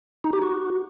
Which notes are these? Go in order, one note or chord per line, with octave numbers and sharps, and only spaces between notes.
D#4
G4
F#4